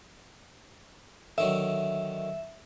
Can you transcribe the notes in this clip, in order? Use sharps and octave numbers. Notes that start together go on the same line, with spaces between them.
D3 D#3 F#3 E5